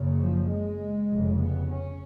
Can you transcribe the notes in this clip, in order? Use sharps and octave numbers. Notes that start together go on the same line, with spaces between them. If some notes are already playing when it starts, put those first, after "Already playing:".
Already playing: F#1 F#2 C#3
F3
G#3
F1 F2 C#3
B3
C#4